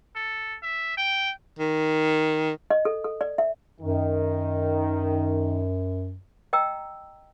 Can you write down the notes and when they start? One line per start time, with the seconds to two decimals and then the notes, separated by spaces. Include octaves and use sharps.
0.15 A4
0.62 E5
0.97 G5
1.59 D#3
2.70 D#5
2.85 A4
3.04 A4
3.21 D5
3.38 E5
3.81 F#2 D#3
6.53 D#5 G5 A#5 E6